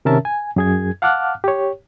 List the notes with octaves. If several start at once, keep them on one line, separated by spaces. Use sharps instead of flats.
C3 D#3 C#4 A#4 E5 A5
G#5
F#2 G#4 G#6
F5 F#5 A5 D6 F6 F#6
G4 C#5